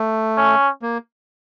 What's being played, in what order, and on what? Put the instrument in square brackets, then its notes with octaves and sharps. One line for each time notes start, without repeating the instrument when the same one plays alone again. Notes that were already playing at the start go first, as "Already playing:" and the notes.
Already playing: [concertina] A3
[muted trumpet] C#4
[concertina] A#3